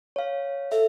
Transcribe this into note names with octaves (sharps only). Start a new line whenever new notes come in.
C#5 F5
A4 E5